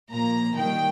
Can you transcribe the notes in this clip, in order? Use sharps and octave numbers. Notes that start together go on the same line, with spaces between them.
A#2 F3 A#3 A#5
D#3 G3 A#3 G5